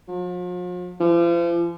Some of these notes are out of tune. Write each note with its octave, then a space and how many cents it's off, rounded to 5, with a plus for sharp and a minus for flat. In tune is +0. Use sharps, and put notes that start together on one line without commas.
F3 +45
F3 -40